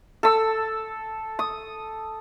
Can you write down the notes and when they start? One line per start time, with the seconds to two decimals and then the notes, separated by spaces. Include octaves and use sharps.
0.23 A4 E6
1.39 D#6